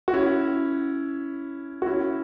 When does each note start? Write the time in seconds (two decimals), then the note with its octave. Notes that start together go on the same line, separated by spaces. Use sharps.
0.08 F#4
0.13 C#4 E4
1.82 F#4
1.86 C#4 E4